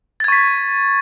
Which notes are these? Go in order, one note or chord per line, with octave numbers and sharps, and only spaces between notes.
C#6 G#6 A6 B6